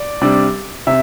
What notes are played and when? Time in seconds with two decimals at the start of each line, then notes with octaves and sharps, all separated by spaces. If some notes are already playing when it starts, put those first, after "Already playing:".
Already playing: D5
0.21 C3 G3 D4
0.87 C3 E5